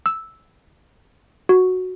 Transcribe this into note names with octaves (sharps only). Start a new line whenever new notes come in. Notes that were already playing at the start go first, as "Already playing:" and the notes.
E6
F#4